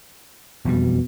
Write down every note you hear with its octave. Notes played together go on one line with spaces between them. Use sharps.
E1 F2 B2 G3